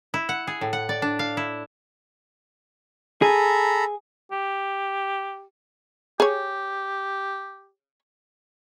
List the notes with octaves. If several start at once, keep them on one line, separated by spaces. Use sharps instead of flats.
E4
F#5
G#4
A2
F#5
D5
D4
F5
E4
G#4 A4 A#5 B5
G4
G4 G#4 C#5